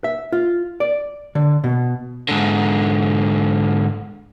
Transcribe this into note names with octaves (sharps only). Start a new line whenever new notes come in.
E5
F4
D5
D3
B2
G#2 D3